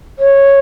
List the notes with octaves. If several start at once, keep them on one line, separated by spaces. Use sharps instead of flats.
C#5